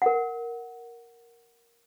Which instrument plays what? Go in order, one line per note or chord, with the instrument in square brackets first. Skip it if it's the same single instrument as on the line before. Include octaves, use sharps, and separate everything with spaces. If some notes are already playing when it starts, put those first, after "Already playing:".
[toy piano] A#4 F#5